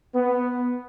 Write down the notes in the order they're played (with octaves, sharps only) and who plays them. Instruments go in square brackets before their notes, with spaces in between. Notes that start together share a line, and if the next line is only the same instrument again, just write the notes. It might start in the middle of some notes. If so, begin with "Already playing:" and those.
[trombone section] B3